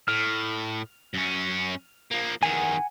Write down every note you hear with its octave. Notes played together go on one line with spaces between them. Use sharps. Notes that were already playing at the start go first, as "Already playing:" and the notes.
A2 F6
F#2 C#4
F3 A#3
E2 D#3 F#5 G#5